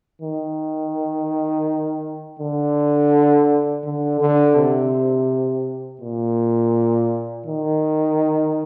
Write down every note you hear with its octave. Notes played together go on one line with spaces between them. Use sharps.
D#3
D3
D3
D3
C3
A#2
D#3